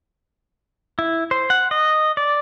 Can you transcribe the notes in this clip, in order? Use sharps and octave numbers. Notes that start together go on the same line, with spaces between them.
E4
C5
F#5
D#5
D5